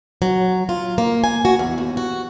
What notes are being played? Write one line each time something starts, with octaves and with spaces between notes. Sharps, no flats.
F#3
F4
A#3
G#5
F#4
E2
D#2
F#4